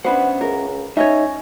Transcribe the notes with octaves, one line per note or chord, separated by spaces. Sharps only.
B3 C#4 D4 B4 C5 E5 F#5
C#2 A#4
C#4 D#4 C#5 D#5 E5